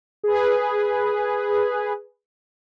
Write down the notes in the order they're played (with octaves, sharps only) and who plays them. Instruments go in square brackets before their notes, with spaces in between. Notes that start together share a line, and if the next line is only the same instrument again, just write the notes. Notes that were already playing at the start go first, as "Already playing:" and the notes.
[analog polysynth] G#4 B4